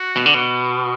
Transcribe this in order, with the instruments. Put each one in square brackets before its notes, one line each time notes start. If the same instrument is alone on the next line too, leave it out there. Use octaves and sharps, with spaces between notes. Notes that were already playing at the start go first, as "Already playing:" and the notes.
Already playing: [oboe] F#4
[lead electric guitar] B2
D3
B2